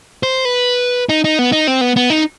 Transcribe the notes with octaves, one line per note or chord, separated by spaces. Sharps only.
C5
B4
D#4
D#4
B3
D#4
C4
B3
B3
D#4